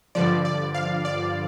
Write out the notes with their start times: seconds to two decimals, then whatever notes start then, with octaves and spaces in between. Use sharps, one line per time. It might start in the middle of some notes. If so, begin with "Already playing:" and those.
0.15 G2 D3 F3 D5
0.45 D5
0.74 F5
1.05 D5